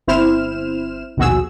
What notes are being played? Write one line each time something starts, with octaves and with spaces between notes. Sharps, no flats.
G1 C4 E4 C5 F6 E7
A#1 D#2 B2 F#4 G#4 E6